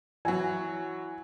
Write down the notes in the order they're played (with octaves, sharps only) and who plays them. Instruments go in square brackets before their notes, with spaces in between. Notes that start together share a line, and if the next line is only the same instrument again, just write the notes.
[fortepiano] E3 F#3 [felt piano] G#5